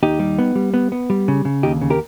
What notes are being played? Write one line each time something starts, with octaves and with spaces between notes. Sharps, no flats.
D#2 D#4 G4
G3
B3
G3
B3
B3
G3
C#3
C#3
D#2 D#4 G4
C#3
G4 A#4